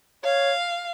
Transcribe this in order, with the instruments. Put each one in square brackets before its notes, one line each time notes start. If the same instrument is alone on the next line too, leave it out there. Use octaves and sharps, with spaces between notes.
[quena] C#5 [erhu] F5